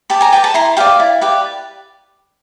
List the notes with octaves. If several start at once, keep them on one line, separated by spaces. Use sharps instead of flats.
G4 A5 B5
G#5 A#5
B4 D5 G5 A5
A5 B5
E4 A#5 C6
G4 B4 D5 F5 G5
E4
G4 B4 D5